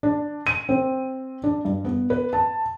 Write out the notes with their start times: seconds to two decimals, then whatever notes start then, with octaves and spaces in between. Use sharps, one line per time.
0.03 D4
0.47 D#7
0.69 C4
1.44 D4
1.65 G2
1.85 B3
2.10 B4
2.33 A5